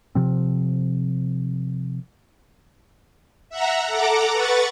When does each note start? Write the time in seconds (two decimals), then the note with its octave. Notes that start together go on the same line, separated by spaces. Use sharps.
0.15 C3 F3 C4
3.50 E5 F#5 A#5
3.87 A4 F#5 A#5 D6
4.32 B4 F#5 C#6 A6